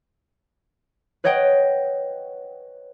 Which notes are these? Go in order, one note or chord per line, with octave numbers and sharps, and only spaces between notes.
B4 C#5 D#5 F#5 G5